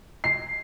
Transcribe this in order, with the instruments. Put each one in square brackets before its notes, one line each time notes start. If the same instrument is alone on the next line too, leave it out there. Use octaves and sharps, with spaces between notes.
[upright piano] C7